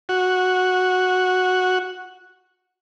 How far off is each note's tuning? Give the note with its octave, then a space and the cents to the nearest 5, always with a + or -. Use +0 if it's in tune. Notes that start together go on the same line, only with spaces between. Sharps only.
F#4 -5